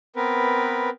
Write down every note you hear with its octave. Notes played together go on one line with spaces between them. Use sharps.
B3 C4 A#4 B4